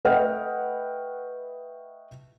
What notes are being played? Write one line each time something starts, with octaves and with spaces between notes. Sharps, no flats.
A3 B4 D#5 F#5 G5 F6